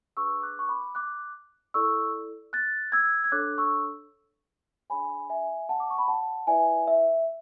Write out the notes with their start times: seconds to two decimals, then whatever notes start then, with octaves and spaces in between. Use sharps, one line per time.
0.17 D4 G#4 B4 C#6 E6
0.42 D6 F#6
0.59 C#6
0.69 B5 D6
0.95 D6 F#6
1.74 E4 A4 D5 C#6 E6
2.53 F#6 A6
2.92 E6 G#6
3.24 G#6
3.32 D4 A4 C#5 D6 F#6
3.58 C#6 E6
4.90 D4 G#4 C#5 G#5 B5
5.30 E5 G#5
5.69 F#5 A5
5.80 D6
5.90 C#6
5.98 B5
6.08 F#5 A5
6.47 E4 B4 D5 E5 G#5
6.87 E5